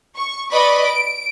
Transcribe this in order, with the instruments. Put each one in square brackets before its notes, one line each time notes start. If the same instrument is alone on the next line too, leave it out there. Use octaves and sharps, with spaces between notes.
[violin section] C#6
B4 D5 D#5 B5 C#6
D7